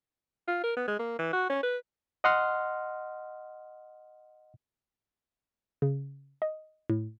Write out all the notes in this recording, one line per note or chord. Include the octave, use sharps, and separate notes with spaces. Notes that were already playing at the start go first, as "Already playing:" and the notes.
F4
A#4
B3
G#3
A#3
E3
F#4
C#4
B4
D#5 F#5 C6 F6
C#3
D#5
A2